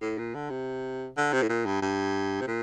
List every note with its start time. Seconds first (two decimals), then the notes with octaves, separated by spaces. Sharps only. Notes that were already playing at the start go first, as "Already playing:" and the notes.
0.02 A2
0.18 A#2
0.34 D3
0.50 C3
1.17 D3
1.33 C3
1.42 A2
1.49 A#2
1.66 G2
1.82 G2
2.41 C3
2.47 A#2